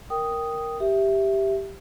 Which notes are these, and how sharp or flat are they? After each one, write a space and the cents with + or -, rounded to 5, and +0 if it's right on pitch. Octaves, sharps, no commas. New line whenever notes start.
A#4 +0 G5 +0 D#6 +0
G4 +0 E5 +0